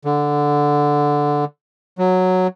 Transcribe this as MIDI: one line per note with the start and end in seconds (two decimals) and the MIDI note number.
0.05 1.45 50
1.98 2.47 54